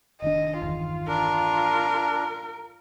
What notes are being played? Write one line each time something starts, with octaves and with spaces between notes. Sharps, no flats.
F1 D#3 D4 D#5
G1 E2 D#3 F4
D4 A#4